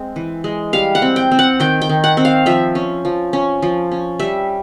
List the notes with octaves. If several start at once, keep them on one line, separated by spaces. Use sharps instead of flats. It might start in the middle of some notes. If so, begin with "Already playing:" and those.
Already playing: G#3 C4
E3
G#3
G3 F5
F#5
C4
G5
C4
F#5
D#3 G5
G5
D#3
F#5
C4
F5
F3 E5
C#4
F3
C#4
F3
C#4
G3 E5